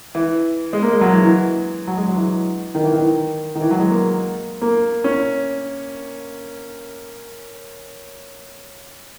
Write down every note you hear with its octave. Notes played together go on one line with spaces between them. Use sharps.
E3
G#3
A#3
G#3
F#3
E3
E3
F#3
G#3
F#3
E3
D#3
E3
D#3
D#3
E3
F#3
G#3
A#3
A#3
C#4